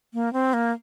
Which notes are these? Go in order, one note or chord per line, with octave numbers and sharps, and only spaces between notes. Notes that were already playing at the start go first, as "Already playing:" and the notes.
A#3
C4
A#3